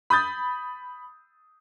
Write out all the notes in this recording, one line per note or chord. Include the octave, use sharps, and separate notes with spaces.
B5 D#6 G6 A6